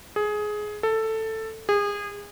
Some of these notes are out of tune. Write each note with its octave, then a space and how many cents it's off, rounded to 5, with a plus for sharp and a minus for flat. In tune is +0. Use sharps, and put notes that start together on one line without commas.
G#4 +15
A4 +10
G#4 -30